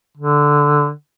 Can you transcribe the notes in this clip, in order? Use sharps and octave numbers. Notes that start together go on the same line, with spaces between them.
D3